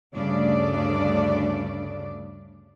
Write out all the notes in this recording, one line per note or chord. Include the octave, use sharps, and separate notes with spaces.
D2 G2 C#3 A3 D4 D5